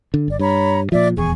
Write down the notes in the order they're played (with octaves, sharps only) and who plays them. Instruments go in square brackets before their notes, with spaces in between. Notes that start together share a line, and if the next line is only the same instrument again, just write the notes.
[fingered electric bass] D3
[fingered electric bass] G1 [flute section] D5
[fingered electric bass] G2 [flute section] C#5 A#5 B5
[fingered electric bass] A#2 F3 [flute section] D5 E5
[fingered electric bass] D#1 E2 [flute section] G#4 G#5 C#6